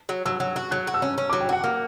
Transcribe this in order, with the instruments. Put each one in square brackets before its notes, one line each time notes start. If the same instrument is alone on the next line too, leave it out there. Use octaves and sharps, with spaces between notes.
[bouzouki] F#3
[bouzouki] F#3 [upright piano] E6
[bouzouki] F#3
F#4
[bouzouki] F#3 [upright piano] F#6
[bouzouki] F#4
[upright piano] E6
[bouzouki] C#4
C#4
[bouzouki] F#3 [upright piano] D6
[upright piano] G5
[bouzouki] F#4 [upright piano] F#5
[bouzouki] A#3